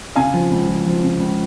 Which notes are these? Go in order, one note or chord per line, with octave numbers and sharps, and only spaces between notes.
C#3 F5 G#5
F3
C#2
F3
F3
C#3
C#2